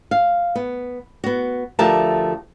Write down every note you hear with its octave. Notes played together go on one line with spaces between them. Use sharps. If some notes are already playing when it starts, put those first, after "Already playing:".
F5
B3
B3 F#4
D2 F3 A3 G4 A#4 A5